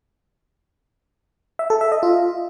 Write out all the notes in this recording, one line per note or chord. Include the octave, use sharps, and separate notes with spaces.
E5
A4
E5
D#5
F4